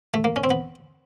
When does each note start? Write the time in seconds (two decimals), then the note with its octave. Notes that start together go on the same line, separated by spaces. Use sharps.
0.14 A3
0.24 A#3
0.36 C#4
0.44 C4
0.51 B3